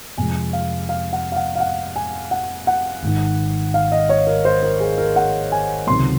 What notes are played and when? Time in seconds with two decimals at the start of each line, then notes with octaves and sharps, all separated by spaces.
0.18 F2 C3 F3 G#3 G#5
0.53 F5
0.89 F5
1.13 F#5
1.32 F5
1.36 F#5
1.56 F5
1.60 F#5
1.96 G#5
2.31 F#5
2.67 F#5
3.03 G#1 G#2 D#3
3.74 F5
3.92 D#5
4.09 C#5
4.27 A#4
4.45 C5
4.63 A#4
4.80 G#4
4.98 A#4
5.16 F#5
5.52 G#5
5.87 C#2 C3 D#3 F#3 C6